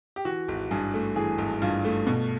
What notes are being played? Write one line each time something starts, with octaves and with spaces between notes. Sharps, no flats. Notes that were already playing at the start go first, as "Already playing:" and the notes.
G4
E3 F#4
G#1
G2 G#4
A3
E3 G#4
G#1
G2 F4
A3
B2